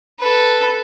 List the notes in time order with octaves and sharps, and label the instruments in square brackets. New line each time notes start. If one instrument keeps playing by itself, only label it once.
[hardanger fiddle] A4 B4